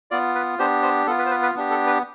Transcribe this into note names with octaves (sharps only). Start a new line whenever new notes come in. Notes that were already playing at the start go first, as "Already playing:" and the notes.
B3 F4 D5
B4
B3 D4 G4 C5
C5
B3 F4 A4
B4
C5
B4
B4
B3 D4 G4
A4
B4